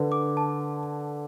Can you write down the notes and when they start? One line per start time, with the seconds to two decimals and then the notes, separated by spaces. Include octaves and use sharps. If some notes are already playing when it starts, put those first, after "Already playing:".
Already playing: D3 B4
0.12 D6
0.37 A5